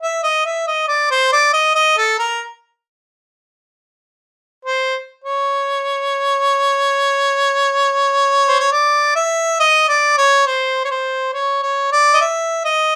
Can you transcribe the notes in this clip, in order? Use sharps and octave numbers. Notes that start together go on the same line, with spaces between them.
E5
D#5
E5
D#5
D5
C5
D5
D#5
D#5
A4
A#4
C5
C#5
C5
C#5
D5
E5
D#5
D5
C#5
C5
C#5
C5
C#5
C#5
D5
D#5
E5
D#5